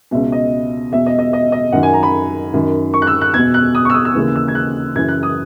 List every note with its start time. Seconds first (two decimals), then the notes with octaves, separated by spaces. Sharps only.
0.11 C#2 B2 E5
0.32 D#5
0.92 E2 B2 E5
1.06 D#5
1.19 D#5
1.33 D#5
1.52 D#5
1.72 F#2 D#3 F#5
1.83 G#5
1.94 A#5
2.03 B5
2.53 F#2 D#3
2.94 C#6
3.02 F#6
3.07 E6
3.21 F#6
3.34 E2 B2 G#6
3.54 F#6
3.75 D#6
3.85 C#6
3.90 E6
3.94 D#6
4.05 E6
4.15 D#2 C#3 E3
4.36 E6
4.48 G#6
4.55 F#6
4.95 F#2 C#3 E3 G#6
5.08 F#6
5.23 D#6